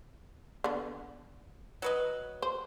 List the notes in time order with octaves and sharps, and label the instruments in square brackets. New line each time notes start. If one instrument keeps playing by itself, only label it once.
[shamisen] D3 B3
[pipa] F#3 B4 D#5
[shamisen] C5